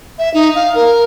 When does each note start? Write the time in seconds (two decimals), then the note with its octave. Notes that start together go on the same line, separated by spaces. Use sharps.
0.19 E5
0.34 D#4
0.55 F5
0.75 A#4